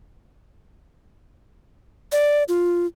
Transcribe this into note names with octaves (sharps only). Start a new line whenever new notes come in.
D5
F4